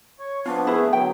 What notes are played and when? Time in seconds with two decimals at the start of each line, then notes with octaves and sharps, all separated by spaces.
0.19 C#5
0.46 F3 B3 D4 F4
0.67 A3 E4 G#4 B4
0.93 D3 F#3 G5